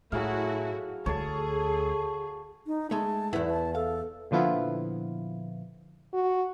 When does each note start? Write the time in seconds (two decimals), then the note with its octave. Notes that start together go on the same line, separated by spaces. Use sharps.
0.12 A2 F#3 A3 E4 F#4 G#4 F5
1.06 D2 G#4 A4 C#5 A5
2.67 D#4
2.91 G#3 A3 A5
3.33 E2 B3 E4
3.50 A5
3.75 A4 F5
4.31 A#2 D3 F3 B3 E4 F4
6.14 F#4